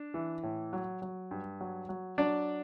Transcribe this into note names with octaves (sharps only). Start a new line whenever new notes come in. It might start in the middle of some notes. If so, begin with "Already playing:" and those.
Already playing: D4
E3
A2
F#3
F#3
G2
F#3
F#3
F#3 D4 D5